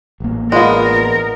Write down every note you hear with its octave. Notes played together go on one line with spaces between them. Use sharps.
A1 A#3
G#3 B3 F4 A#4 D5 F5